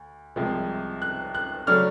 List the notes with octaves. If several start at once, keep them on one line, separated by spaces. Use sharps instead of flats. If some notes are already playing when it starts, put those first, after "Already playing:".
Already playing: D2
C2 C3 F3 G#3
F#6
F#6
C#3 F#3 A3 D4 F6